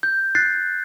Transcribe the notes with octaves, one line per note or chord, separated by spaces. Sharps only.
G6
F#6 A6 C7